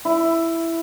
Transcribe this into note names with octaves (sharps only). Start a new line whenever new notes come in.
E4